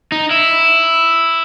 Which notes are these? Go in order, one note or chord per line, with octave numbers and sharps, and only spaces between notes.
D#4
E4